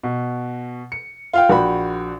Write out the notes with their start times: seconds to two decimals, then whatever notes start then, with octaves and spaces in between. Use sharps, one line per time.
0.03 B2
0.92 C#7
1.33 F4 F5 G5
1.50 A#1 F#4 G5 B5